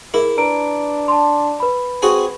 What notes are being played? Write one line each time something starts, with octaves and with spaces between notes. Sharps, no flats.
E4 G#4 A#4
D4 B4 A#5 D7
A5 C6
B4 B5
C4 F#4 G#4 G#5